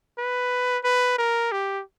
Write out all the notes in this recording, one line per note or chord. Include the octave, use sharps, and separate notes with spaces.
B4
B4
A#4
G4